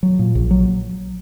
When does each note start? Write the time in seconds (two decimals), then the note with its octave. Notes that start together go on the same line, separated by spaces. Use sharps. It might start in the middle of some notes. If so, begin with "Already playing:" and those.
0.03 F#3
0.19 A#2
0.35 A#1
0.51 F#3